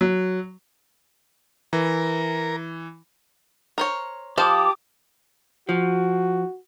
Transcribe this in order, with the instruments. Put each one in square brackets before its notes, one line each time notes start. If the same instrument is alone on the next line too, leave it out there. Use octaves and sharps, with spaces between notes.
[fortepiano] F#3
[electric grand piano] E3 [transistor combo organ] A#4
[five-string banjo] A#4 C5 C#5
[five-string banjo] F3 C5 F5 [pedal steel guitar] G4 A5 [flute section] D6 D#6
[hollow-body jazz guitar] F3 [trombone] F#4